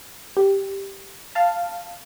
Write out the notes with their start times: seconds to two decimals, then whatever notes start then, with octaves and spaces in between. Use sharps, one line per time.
0.37 G4
1.35 F5 A5